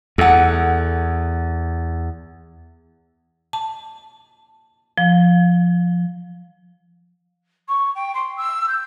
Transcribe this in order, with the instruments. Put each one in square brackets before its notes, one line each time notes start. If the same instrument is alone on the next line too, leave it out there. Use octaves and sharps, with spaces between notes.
[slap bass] E2 [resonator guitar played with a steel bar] A4 F#5
[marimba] A5
F3
[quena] C#6
G5
C6
E6
G6